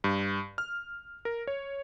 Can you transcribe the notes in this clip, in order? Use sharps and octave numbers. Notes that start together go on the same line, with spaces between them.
G2
F6
A#4
C#5